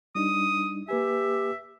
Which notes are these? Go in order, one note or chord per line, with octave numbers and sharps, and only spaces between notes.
G3 D4 D#4 D#6
A#3 G4 B4 E5 G#5